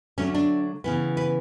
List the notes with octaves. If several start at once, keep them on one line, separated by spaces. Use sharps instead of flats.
D3 F#3 A3 C#4
D4
C#3 E3 B3
B4